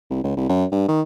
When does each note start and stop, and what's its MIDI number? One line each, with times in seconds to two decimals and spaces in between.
0.11 0.21 36
0.24 0.34 37
0.37 0.48 36
0.50 0.65 42
0.72 0.85 43
0.89 1.02 51